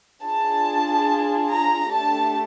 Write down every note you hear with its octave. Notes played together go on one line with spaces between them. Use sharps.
D4 F4 G#4 A5
A#5
A3 D4 G4 A5